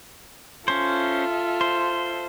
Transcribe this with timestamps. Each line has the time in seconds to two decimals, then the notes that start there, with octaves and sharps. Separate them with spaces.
0.68 C#4 F4 A4 C5 E5
1.61 C5